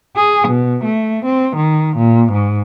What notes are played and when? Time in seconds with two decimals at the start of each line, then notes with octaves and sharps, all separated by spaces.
0.16 G#4
0.48 B2
0.84 A3
1.26 C4
1.57 D#3
1.97 A#2
2.33 G#2